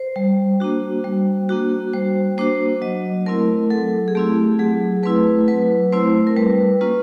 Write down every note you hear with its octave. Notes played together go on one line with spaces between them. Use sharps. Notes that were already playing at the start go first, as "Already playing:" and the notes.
Already playing: C5
G3
A#3 D4 F#4
G3
A#3 D4 F#4
G3 C5
A#3 D4 F#4 C5
F#3 D#5
A3 C4 E4 A#4
F#3 A4
G#4
A3 C4 E4 G4
F#3 G#4
A3 C4 E4 B4
F#3 B4
A3 C4 E4 C5
A#4
G3 B4
A#3 C#4 F4 B4